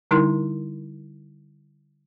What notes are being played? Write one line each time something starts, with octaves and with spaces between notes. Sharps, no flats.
D3 G3 D#4 E4 A#4 C6